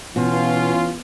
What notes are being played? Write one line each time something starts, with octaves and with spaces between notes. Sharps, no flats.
B2 E3 C#4 F4